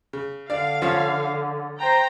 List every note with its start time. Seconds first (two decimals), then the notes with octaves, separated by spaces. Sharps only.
0.13 C#3
0.50 D3 D4 D5 F5
0.82 F3 C#4
1.78 C5 G5 A#5